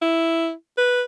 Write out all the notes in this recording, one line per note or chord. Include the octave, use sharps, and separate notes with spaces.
E4
B4